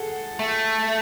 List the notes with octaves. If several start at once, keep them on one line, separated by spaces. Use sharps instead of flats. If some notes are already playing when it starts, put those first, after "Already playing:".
Already playing: G#4 A4 F#5
A3